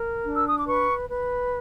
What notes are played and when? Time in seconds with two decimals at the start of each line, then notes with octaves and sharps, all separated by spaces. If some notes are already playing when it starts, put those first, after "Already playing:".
Already playing: A#4
0.26 D4
0.36 E6
0.47 D#6
0.57 D6
0.68 B4 C#6
1.09 B4